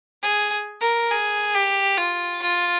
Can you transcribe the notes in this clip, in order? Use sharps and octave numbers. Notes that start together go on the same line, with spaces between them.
G#4
A#4
G#4
G4
F4
F4